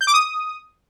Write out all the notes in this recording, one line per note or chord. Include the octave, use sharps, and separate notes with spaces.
G6
D6
D#6